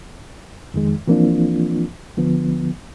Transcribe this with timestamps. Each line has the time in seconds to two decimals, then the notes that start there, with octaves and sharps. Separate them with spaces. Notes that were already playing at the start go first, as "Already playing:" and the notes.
0.74 F2 D#3 G#3
1.07 E3 F3 A#3 C4 D4 F4
2.17 D3 F3 B3